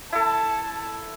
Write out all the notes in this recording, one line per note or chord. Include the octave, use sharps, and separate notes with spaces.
E4 A4 A5